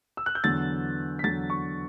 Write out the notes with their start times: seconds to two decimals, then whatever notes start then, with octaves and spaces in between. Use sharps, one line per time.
0.17 E6
0.26 F#6
0.35 G6
0.44 E2 D3 F#3 A6
1.19 B6
1.24 E2 D3 F#3 A6
1.50 C#6